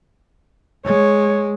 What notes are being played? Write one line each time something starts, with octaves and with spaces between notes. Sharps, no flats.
G#3 C#5